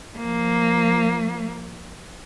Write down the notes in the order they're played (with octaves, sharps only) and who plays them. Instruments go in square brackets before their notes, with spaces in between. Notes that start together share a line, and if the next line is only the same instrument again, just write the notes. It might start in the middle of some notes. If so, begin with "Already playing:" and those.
[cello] F3 A#3